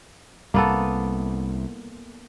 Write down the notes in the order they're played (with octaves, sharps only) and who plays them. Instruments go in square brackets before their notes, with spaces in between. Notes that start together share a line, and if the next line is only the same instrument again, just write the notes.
[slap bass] C2 [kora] A#3 B3 A4